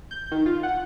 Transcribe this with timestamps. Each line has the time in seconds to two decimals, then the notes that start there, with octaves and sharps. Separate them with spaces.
0.11 G6
0.32 D#3
0.46 F4
0.63 F#5